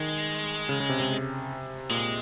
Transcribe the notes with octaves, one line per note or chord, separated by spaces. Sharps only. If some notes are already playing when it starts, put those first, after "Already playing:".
Already playing: D#3 G#3
C#3
C#3
C3
C3
A#2 G#3